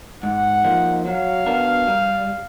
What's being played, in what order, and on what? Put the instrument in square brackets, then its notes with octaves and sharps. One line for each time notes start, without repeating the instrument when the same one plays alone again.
[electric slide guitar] G#2 [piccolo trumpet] F#5
[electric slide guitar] F3 A#3 D#4
[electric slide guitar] F#3 [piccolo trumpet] F5
[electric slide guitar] B3 D4 F#4 A#4
G3